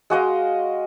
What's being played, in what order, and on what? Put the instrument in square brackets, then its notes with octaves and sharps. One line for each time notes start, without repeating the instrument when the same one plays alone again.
[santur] G#3 F#4 D#5 F5